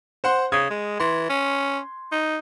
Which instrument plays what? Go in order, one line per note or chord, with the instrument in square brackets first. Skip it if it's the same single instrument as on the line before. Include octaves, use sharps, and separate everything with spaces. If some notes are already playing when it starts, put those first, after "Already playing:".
[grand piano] C5 F#5 C6
[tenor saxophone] C#3 [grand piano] D#6 G#6
[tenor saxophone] G#3
[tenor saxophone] E3 [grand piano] C6
[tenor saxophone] C#4
D#4